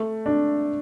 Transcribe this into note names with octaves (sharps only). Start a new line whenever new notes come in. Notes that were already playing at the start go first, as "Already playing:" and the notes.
Already playing: A3
D4